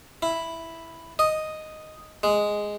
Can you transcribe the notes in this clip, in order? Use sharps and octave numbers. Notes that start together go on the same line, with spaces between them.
E4
D#5
G#3